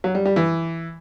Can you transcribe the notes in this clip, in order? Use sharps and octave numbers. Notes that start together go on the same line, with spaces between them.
F#3
G3
G3
E3